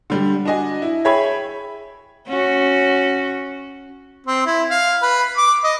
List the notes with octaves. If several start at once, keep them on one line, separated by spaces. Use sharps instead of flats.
D3 G3
D4 F#4 D#5 G#5
E4
G#4 C#5 E5 G5 B5 G#6
C#4 F#4
C4
E4
F5
B4
D6
D#5